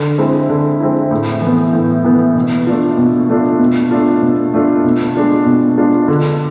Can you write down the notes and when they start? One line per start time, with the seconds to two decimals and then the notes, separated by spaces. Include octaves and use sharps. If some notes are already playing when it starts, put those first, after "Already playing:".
Already playing: D3
0.18 G#3 C4 E4
0.49 D3
0.80 G#3 C4 E4
1.11 A2
1.42 E3 B3
1.73 A2
2.04 E3 B3
2.35 B2
2.67 A3 D4 F4
2.98 B2
3.29 A3 D4 F4
3.59 B2
3.91 A3 D4 F4
4.22 B2
4.54 A3 D4 F4
4.84 B2
5.15 G#3 D4 F4
5.46 B2
5.77 G#3 D4 F4
6.08 D3